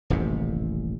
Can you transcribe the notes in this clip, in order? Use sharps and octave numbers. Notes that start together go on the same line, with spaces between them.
D#1 A1 F#2 C3